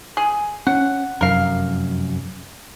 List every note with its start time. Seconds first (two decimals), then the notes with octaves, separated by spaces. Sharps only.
0.17 G#4
0.67 C#4 F#5
1.21 F1 F#2 A#4 F5